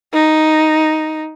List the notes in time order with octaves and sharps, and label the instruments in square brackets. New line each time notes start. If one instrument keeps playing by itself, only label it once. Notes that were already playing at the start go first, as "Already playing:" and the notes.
[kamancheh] D#4